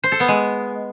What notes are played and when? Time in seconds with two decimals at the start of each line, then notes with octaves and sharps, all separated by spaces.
0.04 C5
0.12 A4
0.20 B3
0.28 G#3